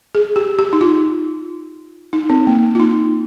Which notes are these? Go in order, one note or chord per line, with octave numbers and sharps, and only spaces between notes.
G#4
G4
G4
D#4
F4
D#4
C4
A#3
F4
D#4